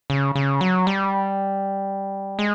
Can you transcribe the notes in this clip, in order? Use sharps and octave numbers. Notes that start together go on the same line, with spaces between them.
C#3
C#3
F#3
G3
G#3